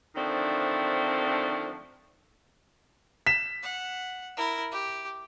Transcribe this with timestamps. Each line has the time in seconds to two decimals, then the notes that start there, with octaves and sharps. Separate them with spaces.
0.15 D3 D#3 F3 A3 C4 D4
3.27 B6 E7
3.63 F#5
4.37 E4 A#4
4.72 G4